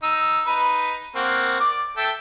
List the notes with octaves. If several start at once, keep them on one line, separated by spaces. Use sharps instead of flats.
D#4 E6
D#4 B4
A#3 C4 F#4
D5 D6
A4 E5 G5